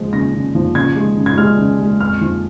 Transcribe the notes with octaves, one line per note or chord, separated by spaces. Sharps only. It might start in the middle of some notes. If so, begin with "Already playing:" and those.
Already playing: C#3 F3 G#3
C#3 A#6
C#3
F3
C#3 G#6
G#3
C#3
G#6
G#3 F6
C#3
G#3
F2 F6
F3